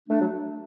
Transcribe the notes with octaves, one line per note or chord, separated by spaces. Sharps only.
A3 D4
F#3